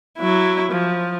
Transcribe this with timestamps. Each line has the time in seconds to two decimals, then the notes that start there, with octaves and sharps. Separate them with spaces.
0.18 F#3 E4
0.72 F3